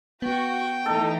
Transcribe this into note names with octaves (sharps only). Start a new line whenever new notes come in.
B3 F#4 G5
E3 A3 D#4 A4